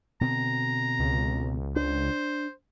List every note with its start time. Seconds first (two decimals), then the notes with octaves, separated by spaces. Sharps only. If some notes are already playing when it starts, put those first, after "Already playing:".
0.21 B2 D3 C4 A#5
0.99 C#2
1.76 D4 C5